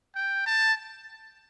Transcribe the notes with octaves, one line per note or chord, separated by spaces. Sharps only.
G5
A5